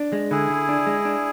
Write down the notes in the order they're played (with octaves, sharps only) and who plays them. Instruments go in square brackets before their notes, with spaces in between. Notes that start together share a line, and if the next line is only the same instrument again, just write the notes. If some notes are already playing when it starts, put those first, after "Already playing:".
Already playing: [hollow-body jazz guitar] D4
G#3
[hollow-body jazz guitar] D3 [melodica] E4 G#4
[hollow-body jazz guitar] D3
D4
G#3
D4